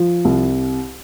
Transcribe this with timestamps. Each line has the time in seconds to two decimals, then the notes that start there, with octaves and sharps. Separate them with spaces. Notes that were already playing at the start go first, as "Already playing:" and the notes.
Already playing: F3
0.25 C2